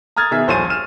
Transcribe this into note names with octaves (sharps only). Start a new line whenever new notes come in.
A#5 D#6 F6 G#6 A6
B2 D#3 G#4 E5
D#1 A#1 C5 C#5 A6 D#7
F6 D#7 E7